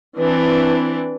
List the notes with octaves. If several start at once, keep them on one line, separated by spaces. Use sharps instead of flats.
E3 C4 D4